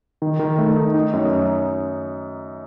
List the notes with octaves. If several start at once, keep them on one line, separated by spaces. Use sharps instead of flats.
D#3
D#3
A3
D#4
D#4
F#2